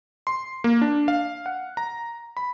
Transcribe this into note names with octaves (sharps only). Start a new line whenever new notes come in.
C6
A#3
D4
F5
F#5
A#5
B5